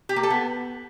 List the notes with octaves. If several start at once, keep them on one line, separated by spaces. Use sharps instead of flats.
G4
A#3
A4
B3